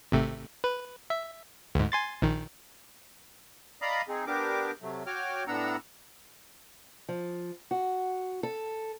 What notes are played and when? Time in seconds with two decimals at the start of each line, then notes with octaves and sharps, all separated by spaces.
0.12 G#1 C3 A3
0.64 B4
1.10 E5
1.75 D2 G#2
1.92 G#5 C6 A6
2.22 A#1 D#3
3.82 D5 D#5 F5 A#5 B5 D#6
4.09 C4 D#4 G#4
4.27 B3 D4 G4 A#4 D6
4.82 C3 F#3 A3
5.06 F#4 C#5 G5 D6 F6
5.48 A2 B3 D4 F#5 A#5 E6
7.09 F3
7.71 F#4
8.43 A4